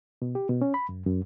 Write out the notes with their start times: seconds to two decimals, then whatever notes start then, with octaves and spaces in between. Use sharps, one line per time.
0.22 B2
0.35 G4
0.49 B2
0.61 C#4
0.74 B5
0.89 F#2
1.06 F#2